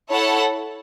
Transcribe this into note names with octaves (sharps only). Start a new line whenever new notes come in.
E4 A4 C#5 F#5 A5